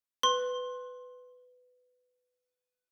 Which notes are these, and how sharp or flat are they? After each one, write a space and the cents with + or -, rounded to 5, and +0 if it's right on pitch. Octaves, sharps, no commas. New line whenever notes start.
B4 +15 C6 +20